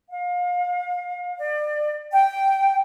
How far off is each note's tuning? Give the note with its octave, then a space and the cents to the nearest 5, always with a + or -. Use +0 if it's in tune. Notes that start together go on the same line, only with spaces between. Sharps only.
F5 +35
D5 +30
G5 -5